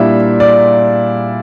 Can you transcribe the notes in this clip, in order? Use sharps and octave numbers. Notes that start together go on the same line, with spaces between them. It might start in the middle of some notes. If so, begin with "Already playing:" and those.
Already playing: A#2 G3 D4 E4 E5
D5